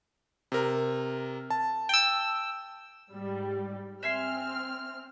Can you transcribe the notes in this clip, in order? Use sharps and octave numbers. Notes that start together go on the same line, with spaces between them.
C3 A#4
A5
G5 E6
G#2 G3
C4 E5 G#5 C6 F6